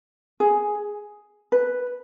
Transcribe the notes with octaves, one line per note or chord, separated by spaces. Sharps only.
G#4
B4